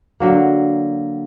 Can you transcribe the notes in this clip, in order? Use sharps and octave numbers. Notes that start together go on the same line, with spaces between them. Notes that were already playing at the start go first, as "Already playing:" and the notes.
D3 F#3 A#3